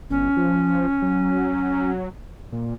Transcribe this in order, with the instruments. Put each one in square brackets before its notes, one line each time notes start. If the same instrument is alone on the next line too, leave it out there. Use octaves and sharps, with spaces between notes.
[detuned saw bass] G1 [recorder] C#4
[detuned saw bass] F3
F#3
A#2